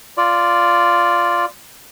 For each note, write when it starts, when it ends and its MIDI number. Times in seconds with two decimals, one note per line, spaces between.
0.17 1.45 65
0.17 1.45 74